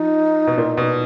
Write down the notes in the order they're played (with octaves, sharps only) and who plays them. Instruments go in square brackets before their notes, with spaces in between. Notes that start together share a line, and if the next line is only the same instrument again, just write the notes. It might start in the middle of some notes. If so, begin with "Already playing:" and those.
Already playing: [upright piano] F3 [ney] D#4
[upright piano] B2
A#2
B2